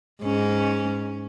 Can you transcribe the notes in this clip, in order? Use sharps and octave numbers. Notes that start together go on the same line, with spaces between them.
G#2 C#4